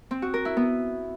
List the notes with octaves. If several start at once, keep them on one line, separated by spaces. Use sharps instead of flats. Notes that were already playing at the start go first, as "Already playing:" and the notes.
C4
F#4
A#4
E4
B3